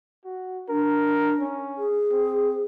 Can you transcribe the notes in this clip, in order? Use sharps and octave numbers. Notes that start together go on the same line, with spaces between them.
F#4
D4 A#4
C#4
G#4
C4